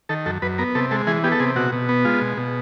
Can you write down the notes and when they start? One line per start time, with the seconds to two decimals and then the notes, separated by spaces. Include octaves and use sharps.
0.09 D#3 A4
0.26 F#2 A4
0.42 F#2 B4
0.58 B3 A#4
0.75 C3 A4
0.91 G#3 A4
1.07 E3 G#4
1.24 B3 G4
1.32 A4
1.40 C3 G#4
1.56 B2 F#4
1.72 B2
1.89 B3
2.05 G#3 F4
2.22 B2
2.38 B2